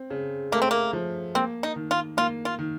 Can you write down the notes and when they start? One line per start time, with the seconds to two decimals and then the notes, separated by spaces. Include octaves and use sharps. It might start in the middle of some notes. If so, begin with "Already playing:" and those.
Already playing: C4
0.10 C#3
0.52 A3 A#3
0.62 C4
0.71 A#3
0.93 F3
1.35 A#3 C4
1.63 D#4
1.76 D#3
1.91 F4
2.17 A#3 F4
2.45 F4
2.59 D#3